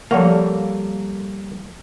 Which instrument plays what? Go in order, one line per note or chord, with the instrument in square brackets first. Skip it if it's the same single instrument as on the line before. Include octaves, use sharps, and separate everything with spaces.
[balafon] F3 F#5 [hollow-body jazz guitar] G3 A#3 [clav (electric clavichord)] A4 C#5 F5